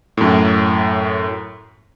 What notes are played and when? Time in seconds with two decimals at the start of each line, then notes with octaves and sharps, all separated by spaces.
0.17 F#2 A2